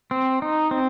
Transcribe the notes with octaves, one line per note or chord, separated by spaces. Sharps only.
C4
D#4
C4